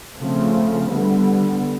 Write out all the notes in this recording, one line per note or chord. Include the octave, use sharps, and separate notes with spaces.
C#3 F3 A3 C4
D3 G3 B3